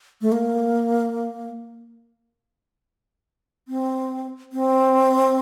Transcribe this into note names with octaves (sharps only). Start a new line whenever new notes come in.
A3
A#3
C4
C4